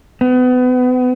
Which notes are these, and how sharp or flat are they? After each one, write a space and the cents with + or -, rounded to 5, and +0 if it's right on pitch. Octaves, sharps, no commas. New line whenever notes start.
B3 +30